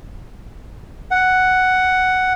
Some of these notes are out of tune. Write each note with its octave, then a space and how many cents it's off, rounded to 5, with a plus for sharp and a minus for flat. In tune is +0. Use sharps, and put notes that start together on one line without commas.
F#5 +5